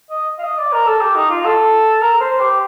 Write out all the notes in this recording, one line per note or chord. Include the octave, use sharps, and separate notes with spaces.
D#5
F5
D#5
D5
A#4
A4
G4
D#4
F4
A4
A#4
C5
G4